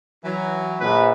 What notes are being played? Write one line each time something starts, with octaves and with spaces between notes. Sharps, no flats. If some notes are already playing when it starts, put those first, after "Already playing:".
E3 F#3
A#1 B4